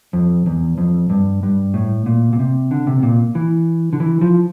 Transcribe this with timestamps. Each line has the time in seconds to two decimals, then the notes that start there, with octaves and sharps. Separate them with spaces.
0.13 F2
0.46 E2
0.78 F2
1.10 G2
1.43 G2
1.74 A2
2.06 A#2
2.33 A#2
2.39 C3
2.71 D3
2.87 C3
3.03 A#2
3.35 E3
3.93 D3
4.00 E3
4.21 F3